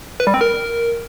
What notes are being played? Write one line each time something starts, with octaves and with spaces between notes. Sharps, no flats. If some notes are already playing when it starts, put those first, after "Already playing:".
B4
G3
C4
A#4